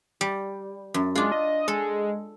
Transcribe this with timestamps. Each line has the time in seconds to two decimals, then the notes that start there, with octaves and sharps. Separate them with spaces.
0.21 G3
0.94 F#2
1.15 G#3 D4 F4
1.32 D#5
1.68 G#3 A4